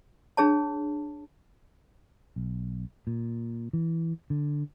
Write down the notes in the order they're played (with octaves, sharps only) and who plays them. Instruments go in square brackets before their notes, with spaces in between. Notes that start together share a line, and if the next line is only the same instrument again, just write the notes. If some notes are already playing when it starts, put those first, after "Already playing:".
[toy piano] D4 G#4 C#5 A5
[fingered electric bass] B1
A#2
E3
D3